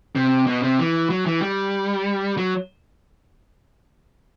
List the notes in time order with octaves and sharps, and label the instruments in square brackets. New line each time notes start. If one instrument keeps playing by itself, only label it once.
[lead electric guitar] C3
B2
C3
E3
F#3
E3
G3
F#3